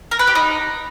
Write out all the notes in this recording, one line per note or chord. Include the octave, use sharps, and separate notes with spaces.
A#4
B4
G4
D#4